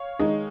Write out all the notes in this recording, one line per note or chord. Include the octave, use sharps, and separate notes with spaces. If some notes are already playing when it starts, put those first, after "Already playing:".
Already playing: C#5 F5
D#3 G#3 D#4